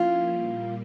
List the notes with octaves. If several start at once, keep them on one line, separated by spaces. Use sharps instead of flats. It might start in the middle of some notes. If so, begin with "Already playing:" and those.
Already playing: F3 A#3 C#4 E4 F4
A#2 G3 A#3